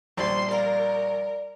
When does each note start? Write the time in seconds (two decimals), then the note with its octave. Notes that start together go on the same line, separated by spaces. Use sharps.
0.17 A#1 G3 B3 C5 C6
0.51 A#4 D5 F5 A#5